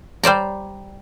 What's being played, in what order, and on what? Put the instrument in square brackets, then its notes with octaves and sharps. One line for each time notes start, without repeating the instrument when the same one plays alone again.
[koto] G3 C5 D5 A#5